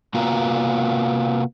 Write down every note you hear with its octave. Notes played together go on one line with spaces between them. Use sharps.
C3 A#3 B3 F4 F#4 A#5